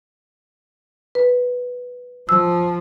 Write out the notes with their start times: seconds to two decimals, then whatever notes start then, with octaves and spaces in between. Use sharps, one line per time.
1.15 B4
2.29 F3 E6